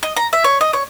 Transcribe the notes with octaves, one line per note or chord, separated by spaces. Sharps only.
D#5
A#5
E5
C#5
D#5
C#5